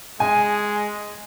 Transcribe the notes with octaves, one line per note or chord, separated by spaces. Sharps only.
G#3 G#5